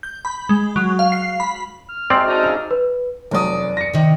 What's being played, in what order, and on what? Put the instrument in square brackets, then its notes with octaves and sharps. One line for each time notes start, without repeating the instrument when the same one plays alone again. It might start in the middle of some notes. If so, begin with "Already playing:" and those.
[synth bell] G6
B5
G#3
F#3
F5
C7
B5
[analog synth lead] F6
[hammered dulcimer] C3 G#3 F#4 [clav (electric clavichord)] C4 D5
[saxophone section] D4 D#4 [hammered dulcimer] E5 F5
[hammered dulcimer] C#3 G#4
[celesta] B4
[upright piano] F1 F#3 D#6 [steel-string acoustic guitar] E2 D5
[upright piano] A#6 C#7
[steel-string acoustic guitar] C3 D#3